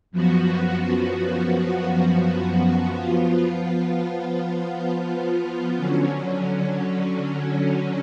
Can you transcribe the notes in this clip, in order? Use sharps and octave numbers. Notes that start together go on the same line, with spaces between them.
F#2 F3 B3 F#4
F3 B3 F4
D3 F#3 C#4